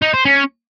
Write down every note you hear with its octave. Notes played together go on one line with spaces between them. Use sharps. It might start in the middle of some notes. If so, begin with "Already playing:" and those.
D#4
C5
C#4